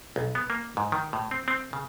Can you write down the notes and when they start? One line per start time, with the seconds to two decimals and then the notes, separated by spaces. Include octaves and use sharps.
0.16 B1
0.35 B3
0.50 A#3
0.77 G#2
0.92 D#3
1.13 A2
1.31 C4
1.48 C4
1.73 C#3